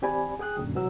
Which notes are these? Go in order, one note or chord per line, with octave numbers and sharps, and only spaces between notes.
E3 C4 G4 D5 G#5 B5
G#4 G5 D#6 F#6
F#2 A#2 D3 F#3
C3 E3 F#3 E6